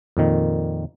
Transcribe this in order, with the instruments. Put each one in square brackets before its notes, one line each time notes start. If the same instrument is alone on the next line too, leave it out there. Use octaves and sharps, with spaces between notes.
[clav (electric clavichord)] F2 A#2 D#3